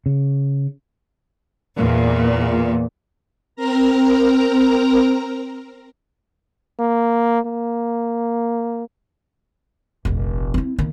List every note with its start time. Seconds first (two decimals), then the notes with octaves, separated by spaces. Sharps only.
0.06 C#3
1.77 E2 A#2
3.56 C4 A#4 A#5
6.79 A#3
7.46 A#3
10.05 F1 A#1
10.54 C4 E4
10.79 D#3 A#3